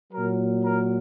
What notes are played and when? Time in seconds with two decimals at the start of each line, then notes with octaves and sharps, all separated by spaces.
0.13 A#2 F#3 A#4
0.63 A#4